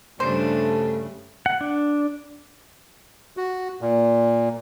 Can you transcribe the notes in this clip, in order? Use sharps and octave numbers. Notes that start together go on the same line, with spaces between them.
G2 C#3 G3 A3 D4 C5
F#5
D4
F#4
A#2